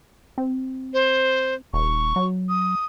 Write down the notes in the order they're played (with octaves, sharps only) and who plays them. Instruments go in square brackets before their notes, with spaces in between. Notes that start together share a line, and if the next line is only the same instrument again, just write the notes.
[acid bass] C4
[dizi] C5
[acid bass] D#1 [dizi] C#6
[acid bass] F#3
[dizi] D#6